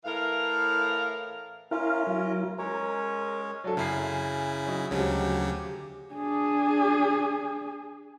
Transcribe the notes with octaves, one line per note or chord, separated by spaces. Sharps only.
A2 E3 A#4 F5
C#4 E4 F4 A#4 F5
F#3 E4 A#4
G#3 C#4 A#4 C#5
F#3 D4 A4
F#2 C#3 E4 G#5 C7
F#3 D#4
D2 C#3 F3 F#3 G#3 G4
D4 G#4